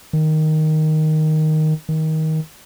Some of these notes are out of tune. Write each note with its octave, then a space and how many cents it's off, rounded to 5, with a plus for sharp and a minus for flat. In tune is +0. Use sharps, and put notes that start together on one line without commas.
D#3 +0
D#3 +20